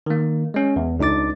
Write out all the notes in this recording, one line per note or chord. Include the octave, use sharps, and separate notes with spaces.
D#3 A#3
G#3 C#4
E2
C#2 D4 D#4 D6 A6